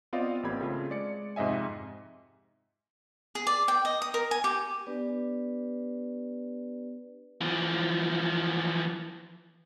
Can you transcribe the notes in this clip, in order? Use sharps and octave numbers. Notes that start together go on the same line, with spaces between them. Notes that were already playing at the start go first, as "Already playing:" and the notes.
B3 C4 F4 D5 D#5 F5
A1 A#3 C4 G4 B5 G#6
C#3 A3 C4 F4
G#3 D5 C#7
F2 G#2 C3 D#5 E5 G#5
G#4
D5
G5
D#5
D#6
A#4
G#5
G4
B3 D4 G4 B4 D5
E3 F3